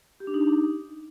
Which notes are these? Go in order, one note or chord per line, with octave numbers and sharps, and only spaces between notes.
G4
D4
D#4